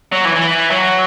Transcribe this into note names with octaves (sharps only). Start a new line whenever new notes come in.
F#3
E3
E3
F#3